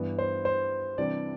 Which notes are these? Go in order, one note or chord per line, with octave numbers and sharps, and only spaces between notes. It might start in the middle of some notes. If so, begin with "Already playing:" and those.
Already playing: G2 E3 B3
C5
C5
C3 E3 G3 D4 D5